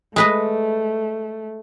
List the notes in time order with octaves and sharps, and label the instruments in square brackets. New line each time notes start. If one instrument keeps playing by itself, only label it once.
[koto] G#3 B4 D#5 [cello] A3